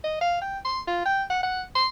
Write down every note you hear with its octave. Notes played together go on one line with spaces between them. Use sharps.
D#5
F5
G5
C6
F4
G5
F#5
F#5
C6